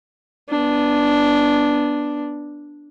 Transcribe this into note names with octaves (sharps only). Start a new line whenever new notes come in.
B3 D4